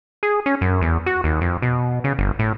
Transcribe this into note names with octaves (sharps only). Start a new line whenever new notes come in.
G#4
C#4
F#2
E2
F#4
D#2
F2
B2
C#3
G1
A2